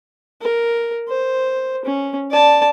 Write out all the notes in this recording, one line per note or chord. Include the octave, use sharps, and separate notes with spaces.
A#4
C5
C#4
D5 A5